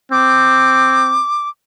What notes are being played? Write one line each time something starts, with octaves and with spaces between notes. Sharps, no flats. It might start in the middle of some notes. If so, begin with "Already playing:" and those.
C4 D6